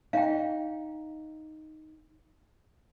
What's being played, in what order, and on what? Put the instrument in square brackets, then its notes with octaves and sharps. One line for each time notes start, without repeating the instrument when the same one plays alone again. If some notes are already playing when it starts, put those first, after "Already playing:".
[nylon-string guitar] D#4 [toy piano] F5 G5